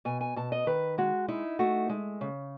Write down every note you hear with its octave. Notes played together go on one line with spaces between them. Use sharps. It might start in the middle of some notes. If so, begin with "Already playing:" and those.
B2 G#5
G#5
B2 A5
D#5
D#3 B4
G#3 F#4
D#4 E4
A3 F#4
G#3
C#3